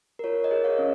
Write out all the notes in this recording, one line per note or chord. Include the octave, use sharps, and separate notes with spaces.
A#4
F4 C#5
A#4 D#5
G#4
C#5 F5
C#4